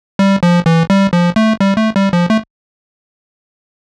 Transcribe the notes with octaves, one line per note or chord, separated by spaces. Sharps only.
G3
F3
E3
G3
F3
A3
G3
A3
G3
F3
A3